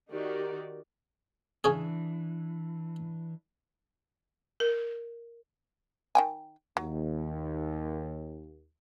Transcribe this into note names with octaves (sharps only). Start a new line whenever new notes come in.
D#3 D#4 F#4 G4 A#4 D5
C#3 E3 C#4 D4 G#4
A#4
D#3 G5 G#5
D#2 F#3